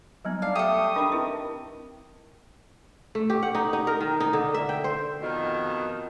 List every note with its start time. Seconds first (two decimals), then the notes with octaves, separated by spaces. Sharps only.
0.25 F#3 G3 B3 D#4
0.42 D4 F5
0.55 A3 G4 A4 D#6
0.96 D#3 D4 B5
1.12 C4 E4 B4
3.15 A3
3.30 G4
3.43 F#5
3.55 D#4
3.73 D#4
3.87 A#4
4.01 D#3
4.20 D#4
4.33 D3
4.54 E5
4.69 G5
4.84 C5
5.21 F2 B2 D#3